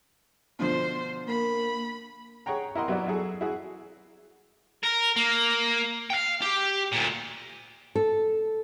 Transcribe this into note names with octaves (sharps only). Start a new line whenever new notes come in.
B2 D3 F3 C5
A#3 B5
G#4 C#5 F#5 G5 A#5
E4 A#4 D#5 F#5 C6
F#3 B3 E4 F#4 D5 E5
F#3 E4 G#4 A4
E4 F#4 G#4
A#4
A#3
F5 G5
G4
D2 A#2
A4